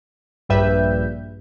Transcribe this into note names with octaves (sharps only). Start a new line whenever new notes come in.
A#1 G2 G3 B4 E5 G6